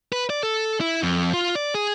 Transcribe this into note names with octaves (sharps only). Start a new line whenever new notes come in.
B4
D5
A4
E4
F2
F4
D5
G#4